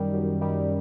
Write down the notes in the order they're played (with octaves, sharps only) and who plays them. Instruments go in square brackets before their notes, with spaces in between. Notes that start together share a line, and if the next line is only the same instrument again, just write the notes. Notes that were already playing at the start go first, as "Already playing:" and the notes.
Already playing: [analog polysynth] F#2 D#3 G3
F#2
D#3 G3